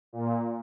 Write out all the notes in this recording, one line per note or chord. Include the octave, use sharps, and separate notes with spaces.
A#2